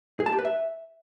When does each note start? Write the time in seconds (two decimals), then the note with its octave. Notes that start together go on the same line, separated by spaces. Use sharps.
0.20 G#4
0.26 A5
0.32 G4
0.39 B4
0.45 E5